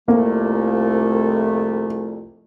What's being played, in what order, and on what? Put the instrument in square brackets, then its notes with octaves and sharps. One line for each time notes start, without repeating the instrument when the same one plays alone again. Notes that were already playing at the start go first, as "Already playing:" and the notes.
[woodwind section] C2 F2 A3 [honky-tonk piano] A#3